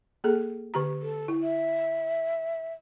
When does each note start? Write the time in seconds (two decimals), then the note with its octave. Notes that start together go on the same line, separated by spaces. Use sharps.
0.24 A#3 G#4 A4
0.74 D3 G4 A#5
1.02 A4
1.28 E4
1.42 E5